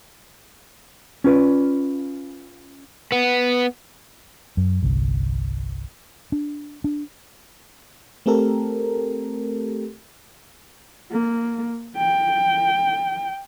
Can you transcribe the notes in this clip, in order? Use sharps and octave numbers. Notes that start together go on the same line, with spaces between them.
C#4 F4 B4 D5
B3
F#2
G1 C2
D4
D4
A3 C4 G4 A4 A#4
A#3
G5